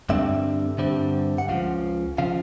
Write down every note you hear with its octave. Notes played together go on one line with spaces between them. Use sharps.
G2 D3 G3 C4 E5
G2 D3 G3 C4
F#5
C#2 C#3 F3 F5
C#3 F3 F5